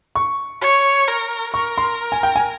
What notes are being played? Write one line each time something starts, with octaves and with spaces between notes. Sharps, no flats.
C#6
C#5
A#4
A#4 C#6
C6
G#5
G5
G#5